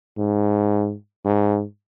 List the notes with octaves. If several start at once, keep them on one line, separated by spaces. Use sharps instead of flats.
G#2
G#2